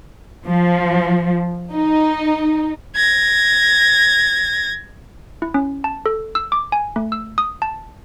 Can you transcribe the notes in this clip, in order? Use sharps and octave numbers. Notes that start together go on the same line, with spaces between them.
F3
D#4
G#6 A#6
E4
C#4
A5
A4
E6
D6
G#5
A3
E6
D#6
A5